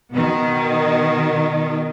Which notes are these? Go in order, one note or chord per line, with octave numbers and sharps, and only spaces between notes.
B2 D#3